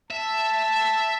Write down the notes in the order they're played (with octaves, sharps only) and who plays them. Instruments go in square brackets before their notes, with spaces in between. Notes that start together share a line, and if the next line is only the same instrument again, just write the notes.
[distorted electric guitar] E5 [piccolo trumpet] A5